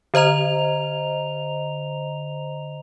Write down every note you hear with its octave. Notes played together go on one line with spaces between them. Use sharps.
D3 C5 D#5 A#5 F7